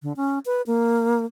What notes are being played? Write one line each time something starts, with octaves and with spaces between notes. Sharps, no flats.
D3
C#4
B4
A#3